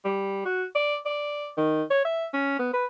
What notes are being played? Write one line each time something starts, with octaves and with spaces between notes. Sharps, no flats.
G3
F#4
D5
D5
D#3
C#5
E5
C#4
B3
B4